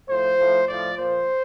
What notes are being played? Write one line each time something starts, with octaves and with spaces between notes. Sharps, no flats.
A2 F3 C5
A2 F3
A2 F3 D5
A#2 F3 C5